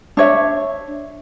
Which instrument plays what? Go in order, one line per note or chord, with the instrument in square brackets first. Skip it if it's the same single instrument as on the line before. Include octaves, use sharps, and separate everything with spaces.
[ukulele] D4 C#5 E5